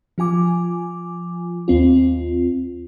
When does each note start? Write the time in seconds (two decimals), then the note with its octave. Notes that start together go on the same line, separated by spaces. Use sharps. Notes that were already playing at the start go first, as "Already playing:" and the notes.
0.18 F3 F4 G#5 D6
1.68 D#2 C4 F4